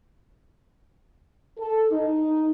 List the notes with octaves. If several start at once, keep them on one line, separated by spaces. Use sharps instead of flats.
A4
D#4